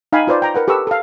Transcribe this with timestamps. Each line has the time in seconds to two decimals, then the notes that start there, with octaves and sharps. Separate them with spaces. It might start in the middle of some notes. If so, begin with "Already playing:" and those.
0.13 D#4 F5 G5 G#5 B5
0.27 F4 B4 C5 D5
0.42 G5 A#5
0.54 A#4 B4 F#5
0.68 G4 A4 B4 C#6 E6
0.87 A4 F5